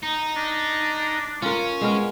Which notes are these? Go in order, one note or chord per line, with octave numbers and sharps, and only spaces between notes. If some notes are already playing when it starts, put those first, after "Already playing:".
D#4
D4
C#4 F4 A#4
G#3 B3 A#4